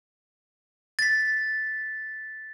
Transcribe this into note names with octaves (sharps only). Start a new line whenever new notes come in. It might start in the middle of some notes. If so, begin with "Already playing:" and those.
A6 B6